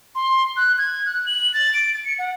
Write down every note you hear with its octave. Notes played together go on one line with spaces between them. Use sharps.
C6
F#6
G#6
F#6
F#7
A6
D7
A6
C#7
F#5